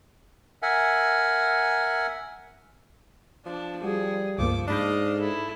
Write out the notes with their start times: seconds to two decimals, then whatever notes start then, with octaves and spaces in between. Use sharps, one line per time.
0.62 A#4 E5 F#5 G#5
3.46 F3 D4
3.84 G3 F#4 G#4
4.38 C#2 G2 F3 A#3 D6
4.68 G#2 D4 D#5 F5 A5 B5 G6
5.17 E4 A4